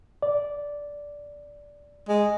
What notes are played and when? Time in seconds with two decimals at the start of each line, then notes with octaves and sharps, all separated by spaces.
0.22 D5
2.09 G#3